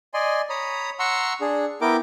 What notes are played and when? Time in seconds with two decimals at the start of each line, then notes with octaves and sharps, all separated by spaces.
0.14 D5 D#5 G#5 C6
0.50 C#5 A#5 B5 D#6
0.99 F#5 A#5 C6 C#6 E6
1.41 D4 G#4
1.81 B3 E4 A#4 G5 D6